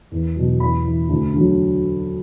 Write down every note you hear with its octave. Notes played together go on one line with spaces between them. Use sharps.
E2
B2 F#3
E2 B5
E3
D2
D3 F#3